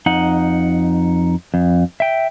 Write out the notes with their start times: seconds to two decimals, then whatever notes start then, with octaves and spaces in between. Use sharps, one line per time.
0.06 F2 D#4 F#5
1.54 F2
2.00 E5 G5